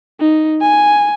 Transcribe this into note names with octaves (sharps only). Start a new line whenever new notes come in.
D#4
G#5